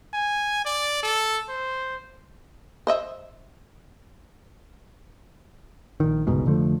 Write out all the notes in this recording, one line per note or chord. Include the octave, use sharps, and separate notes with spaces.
G#5
D5
A4
C5
C5 D#5 E5
A#1 D#3
G1 C#2 G#2 B2
F1 D3 F3 A3